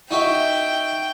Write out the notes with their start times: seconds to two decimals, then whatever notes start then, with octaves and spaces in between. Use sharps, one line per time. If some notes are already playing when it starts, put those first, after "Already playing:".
0.11 D#4 F#4 E5 G5